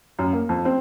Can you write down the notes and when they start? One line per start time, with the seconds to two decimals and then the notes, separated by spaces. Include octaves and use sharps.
0.19 F#2
0.33 A#3
0.49 F2
0.65 C4